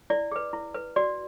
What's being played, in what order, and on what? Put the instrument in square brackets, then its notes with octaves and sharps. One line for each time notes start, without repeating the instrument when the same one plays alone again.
[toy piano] E4 D5
G#4 B4
E4
B4
F#4 D5